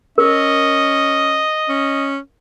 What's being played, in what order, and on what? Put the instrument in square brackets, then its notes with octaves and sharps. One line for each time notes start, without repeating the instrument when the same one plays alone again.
[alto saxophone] C#4 [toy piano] A#4 [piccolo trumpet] D#5
[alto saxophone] C#4